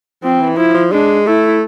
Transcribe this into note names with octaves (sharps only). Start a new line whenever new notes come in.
F3 C4
E3
F3 E4
F3
G#3 D4
A3 E4